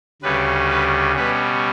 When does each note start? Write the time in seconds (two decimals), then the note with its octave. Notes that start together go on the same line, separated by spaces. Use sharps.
0.22 D2 C#3 G3 C#4 B4
0.70 B4
1.16 B2 G3 C#4 B4